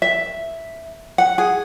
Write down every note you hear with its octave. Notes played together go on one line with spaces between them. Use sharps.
E5
F#5
G#4